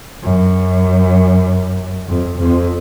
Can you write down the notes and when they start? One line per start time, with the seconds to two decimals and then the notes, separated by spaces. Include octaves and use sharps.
0.23 F#2
2.08 F2
2.38 F2